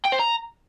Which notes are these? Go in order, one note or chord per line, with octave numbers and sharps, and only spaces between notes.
G5
C5
A#5